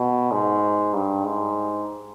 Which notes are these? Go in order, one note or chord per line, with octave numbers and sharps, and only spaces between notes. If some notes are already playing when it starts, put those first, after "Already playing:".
Already playing: B2
G#2
G2
G#2